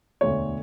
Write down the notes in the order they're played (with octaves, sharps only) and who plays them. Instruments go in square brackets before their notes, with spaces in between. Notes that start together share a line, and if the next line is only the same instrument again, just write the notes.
[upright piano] E1 D2 D3 C#5